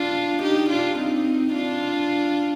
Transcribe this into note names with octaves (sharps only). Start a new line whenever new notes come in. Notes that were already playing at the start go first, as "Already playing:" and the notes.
Already playing: D4 F4
D#4 G4
D4 F4
C4 D#4
D4 F4